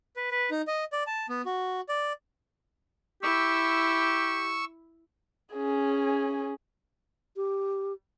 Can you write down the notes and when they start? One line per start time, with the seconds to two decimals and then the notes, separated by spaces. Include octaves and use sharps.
0.16 B4
0.31 B4
0.51 D#4
0.67 D#5
0.93 D5
1.07 A5
1.29 B3
1.45 F#4
1.89 D5
3.23 E4 G4 C#6 E6
5.53 C#4 G#4
7.36 G4